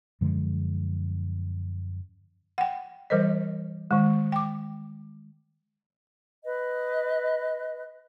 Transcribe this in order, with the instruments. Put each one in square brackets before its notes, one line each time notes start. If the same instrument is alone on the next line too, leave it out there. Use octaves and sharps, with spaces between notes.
[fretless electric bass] F#2 D3 F3 G#3
[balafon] F#5 G5
E3 G3 A#4 C5 D#5
D#3 G#3
G5 D6
[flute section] B4 D#5